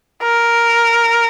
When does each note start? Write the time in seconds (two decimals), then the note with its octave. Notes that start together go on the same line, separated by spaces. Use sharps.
0.23 A#4